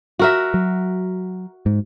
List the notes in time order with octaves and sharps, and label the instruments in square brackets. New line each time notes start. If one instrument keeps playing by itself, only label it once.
[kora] F#4 A#4 E5
[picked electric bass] F#3
G#2